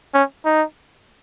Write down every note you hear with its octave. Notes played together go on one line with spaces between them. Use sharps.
C#4
D#4